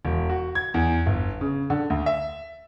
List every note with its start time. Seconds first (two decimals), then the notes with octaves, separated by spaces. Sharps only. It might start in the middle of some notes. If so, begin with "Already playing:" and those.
0.05 E1
0.30 F#4
0.55 G#6
0.74 E2
1.06 G1
1.41 C#3
1.70 D3
1.90 D2
2.06 E5